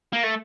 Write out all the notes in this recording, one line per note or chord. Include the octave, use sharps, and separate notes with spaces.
A#3
A3